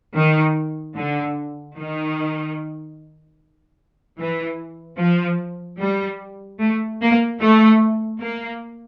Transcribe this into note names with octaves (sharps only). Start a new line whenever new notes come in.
D#3
D3
D#3
E3
F3
G3
A3
A#3
A3
A#3